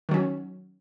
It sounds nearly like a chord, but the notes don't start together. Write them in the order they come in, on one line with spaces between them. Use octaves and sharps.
D#3 F#3 C#4